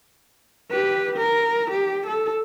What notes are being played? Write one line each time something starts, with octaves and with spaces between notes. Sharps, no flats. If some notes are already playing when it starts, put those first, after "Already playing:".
G4 B4
A#4
G4
A4